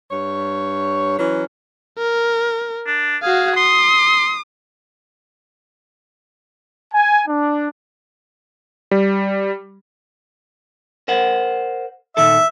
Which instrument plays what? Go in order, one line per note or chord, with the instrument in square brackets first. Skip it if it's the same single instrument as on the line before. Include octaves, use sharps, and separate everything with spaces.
[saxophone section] G2 C#5
E3 F#3 C#4
[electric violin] A#4
[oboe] D4
[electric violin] F#4 F5 [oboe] G#4
[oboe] C6 [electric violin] D#6
[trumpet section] G#5
D4
[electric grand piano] G3
[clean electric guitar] A#4 C5 F#5
[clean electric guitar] A#2 D#3 A4 [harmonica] E5